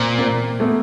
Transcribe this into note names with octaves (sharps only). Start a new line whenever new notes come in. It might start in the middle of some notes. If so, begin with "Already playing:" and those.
Already playing: A#2 A#3 C4
A#3 C4
A3 B3